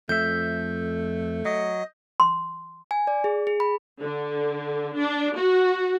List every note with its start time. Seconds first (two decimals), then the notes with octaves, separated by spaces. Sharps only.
0.09 F2 A3 E5 G6
1.45 F#3 D#5
2.20 C6
2.91 G#5
3.07 D5
3.24 G#4
3.47 G#4
3.60 B5
4.01 D3
4.98 D4
5.36 F#4